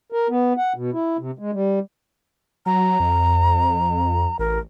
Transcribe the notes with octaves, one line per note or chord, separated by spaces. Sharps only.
A#4
B3
F#5
B2
E4
C3
G#3
G3
F#3 A#5
F2
A1 A#4